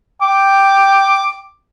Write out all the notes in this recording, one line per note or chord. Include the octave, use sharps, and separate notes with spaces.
G5 D6